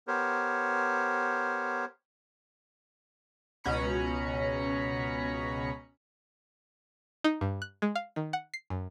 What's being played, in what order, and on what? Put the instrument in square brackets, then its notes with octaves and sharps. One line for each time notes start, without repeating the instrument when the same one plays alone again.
[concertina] B3 G4 A#4 C5 C#5
[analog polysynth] C#2 B2 C#4 A#5 B5 C#7
[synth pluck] D#4
G2
F#6
G#3
F5
D#3
F#5
C7
F#2